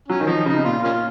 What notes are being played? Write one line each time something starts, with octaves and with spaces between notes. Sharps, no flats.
F#3 C#4
D#3
F3 D#4
C#3 D#4
C3
A#2 F4
A#3 C#4 F4